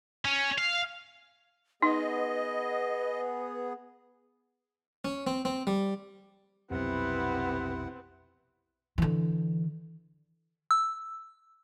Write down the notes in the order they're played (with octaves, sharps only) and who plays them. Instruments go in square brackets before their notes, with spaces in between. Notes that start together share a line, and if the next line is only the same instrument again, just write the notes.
[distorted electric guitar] C#4
F5
[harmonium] B3 G#4 [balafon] D#4 [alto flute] B4 [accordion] D#5
[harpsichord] C#4
C4
C4
G3
[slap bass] B1 F2 [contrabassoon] C3 [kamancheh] B3 C4 [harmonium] E4 B4 F#5
[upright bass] D3 E3
[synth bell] E6